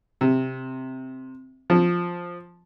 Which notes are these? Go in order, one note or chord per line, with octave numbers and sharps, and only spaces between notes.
C3
F3